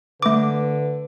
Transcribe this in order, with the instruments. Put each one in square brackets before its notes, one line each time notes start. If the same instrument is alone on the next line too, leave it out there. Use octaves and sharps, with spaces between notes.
[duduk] D3 [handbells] A3 D6 [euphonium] B4